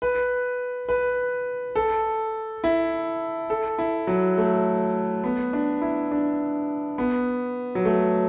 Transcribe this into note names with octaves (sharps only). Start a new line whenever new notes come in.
B4
B4
A4
E4
A4
E4
F#3
A3
B3
D4
E4
D4
B3
F#3
A3